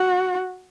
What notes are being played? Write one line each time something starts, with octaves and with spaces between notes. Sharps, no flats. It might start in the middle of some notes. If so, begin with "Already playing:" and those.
Already playing: F#4